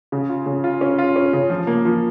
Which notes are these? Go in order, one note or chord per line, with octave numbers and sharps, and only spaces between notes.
C#3
F4
C#3
F4
C#4
F4
C#4
C#3
F3
A#3
F3